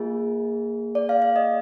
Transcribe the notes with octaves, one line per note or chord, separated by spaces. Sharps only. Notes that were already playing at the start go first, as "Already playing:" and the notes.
Already playing: A#3 F4 G#4
D5
F5
F5
D#5